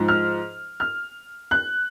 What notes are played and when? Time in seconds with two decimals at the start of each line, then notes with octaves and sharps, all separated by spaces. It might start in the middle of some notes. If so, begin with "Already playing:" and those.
Already playing: G#2 F3
0.08 F6
0.80 F6
1.51 F#6